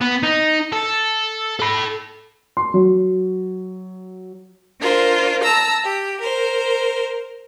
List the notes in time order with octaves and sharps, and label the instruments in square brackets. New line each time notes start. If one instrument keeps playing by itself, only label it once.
[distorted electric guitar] B3
D#4
A4
A4 B5
[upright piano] C6
F#3
[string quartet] D4 F4 A#4 C5
A5 A#5 E6
G4
A#4 C5